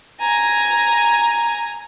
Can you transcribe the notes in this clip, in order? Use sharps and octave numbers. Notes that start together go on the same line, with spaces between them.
G#5 A#5